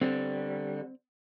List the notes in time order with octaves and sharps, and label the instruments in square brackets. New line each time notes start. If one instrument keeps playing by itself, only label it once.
[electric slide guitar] D3 G3 [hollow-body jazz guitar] C4